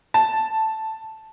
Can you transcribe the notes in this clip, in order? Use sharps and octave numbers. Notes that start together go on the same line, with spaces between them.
A5